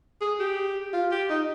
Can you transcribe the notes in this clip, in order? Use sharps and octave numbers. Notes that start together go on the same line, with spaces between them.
G#4
G4
F4
G4
D#4